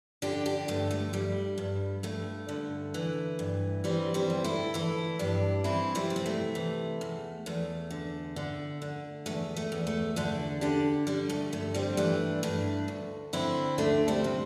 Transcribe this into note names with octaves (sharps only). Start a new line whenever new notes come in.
D3 D4 G4
D4 G4
G2 A3
A3
G2 G3
G2
G2 A3
D3
E3
G2
E3 G3 C4
G3 C4
D2
E4 A4
E3 E4 A4
G2 D4 G4
E3 C4 E4
G3 C4
C3
C4
A3
E3
E2
E2 A3
D3
D3
D3
E2 A3
A3
E2
A3
D3 A3 D4
D3 D4 G4
D3 G3
A3
G2 A3
G3 C4
E3 A3 D4
G2 A3 D4
D2
D3 C4 E4
D2 A3 D4
G3 C4
C3